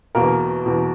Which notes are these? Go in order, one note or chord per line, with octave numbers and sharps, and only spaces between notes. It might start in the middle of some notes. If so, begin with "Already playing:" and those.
E2 B2 A#3 A#4
E2 B2